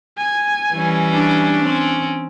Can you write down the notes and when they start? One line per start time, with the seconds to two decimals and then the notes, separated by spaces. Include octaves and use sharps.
0.18 G#5
0.73 E3 G3 C#4
1.14 D4
1.62 C4 C#4